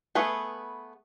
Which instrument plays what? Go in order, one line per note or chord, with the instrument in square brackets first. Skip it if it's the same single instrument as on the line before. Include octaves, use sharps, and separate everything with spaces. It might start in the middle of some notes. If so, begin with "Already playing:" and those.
[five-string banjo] A3 B3 G#4 B4